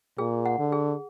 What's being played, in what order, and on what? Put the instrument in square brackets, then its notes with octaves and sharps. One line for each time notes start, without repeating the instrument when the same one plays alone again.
[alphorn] A#2 [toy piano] G#4
[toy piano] F#5
[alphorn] D3
[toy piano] G#4